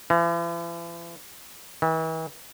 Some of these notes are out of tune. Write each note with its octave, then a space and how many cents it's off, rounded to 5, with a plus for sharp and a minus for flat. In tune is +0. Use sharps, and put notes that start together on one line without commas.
E3 +45
E3 -40